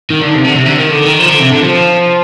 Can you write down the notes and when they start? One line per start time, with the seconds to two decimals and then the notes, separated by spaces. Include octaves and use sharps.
0.10 D#3
0.21 D3
0.34 C3
0.45 D3
0.55 C3
0.66 D3
0.77 D#3
0.90 D3
1.05 D#3
1.19 F3
1.29 D3
1.41 C3
1.50 D3
1.62 F3